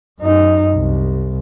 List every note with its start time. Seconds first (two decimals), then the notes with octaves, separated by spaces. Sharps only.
0.20 F#2 D#4
0.75 C2